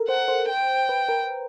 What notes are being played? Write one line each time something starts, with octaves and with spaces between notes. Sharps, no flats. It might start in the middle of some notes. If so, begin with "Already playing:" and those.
Already playing: A4 A#4
C5 F#5
C5
G5
B4
A#4